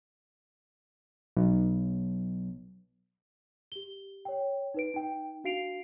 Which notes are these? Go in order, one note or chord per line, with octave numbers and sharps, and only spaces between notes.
B1
G4 G7
C#5 G5
D#4 B4 D7
D#4 G5
D4 F#4 F5 C7 D7 F7